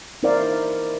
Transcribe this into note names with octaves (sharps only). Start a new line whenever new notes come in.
D#4 E4 A#4 C5 D5 F5